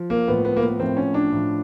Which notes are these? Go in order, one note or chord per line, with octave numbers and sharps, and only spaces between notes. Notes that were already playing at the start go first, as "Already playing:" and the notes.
Already playing: F3
A#3
A2 F3 B3
B3
A#3
B3
A2 F3 C4
C#4
D4
A2 F3